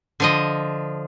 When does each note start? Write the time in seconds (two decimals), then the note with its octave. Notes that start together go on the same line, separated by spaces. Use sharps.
0.20 D3 F3 D#5